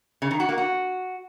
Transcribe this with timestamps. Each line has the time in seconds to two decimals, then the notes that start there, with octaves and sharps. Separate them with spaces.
0.22 C#3
0.31 D#3
0.40 F#4
0.49 A#3
0.58 F#4